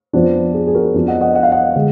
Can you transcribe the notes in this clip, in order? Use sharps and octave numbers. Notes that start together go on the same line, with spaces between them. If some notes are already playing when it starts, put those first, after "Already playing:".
F2 F3 B3 D4
G#4
G#4
F#4 A#4
F2 F3 B3 D4
D#5 F#5
D#5 F#5
F#5
F5
D#5 F#5
D3 G#3